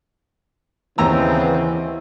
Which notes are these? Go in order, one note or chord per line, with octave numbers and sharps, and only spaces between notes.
D#2 C#3 E3 B3 C4 A#5 E6